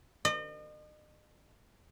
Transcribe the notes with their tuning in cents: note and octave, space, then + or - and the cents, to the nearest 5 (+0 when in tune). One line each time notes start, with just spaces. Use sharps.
D#5 -40